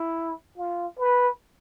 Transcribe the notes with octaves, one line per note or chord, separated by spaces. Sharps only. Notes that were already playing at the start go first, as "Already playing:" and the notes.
Already playing: E4
F4
B4